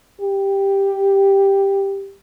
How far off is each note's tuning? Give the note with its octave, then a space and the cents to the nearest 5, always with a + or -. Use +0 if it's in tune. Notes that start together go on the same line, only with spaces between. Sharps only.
G4 +5